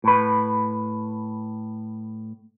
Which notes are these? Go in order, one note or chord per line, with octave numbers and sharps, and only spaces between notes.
A2 B4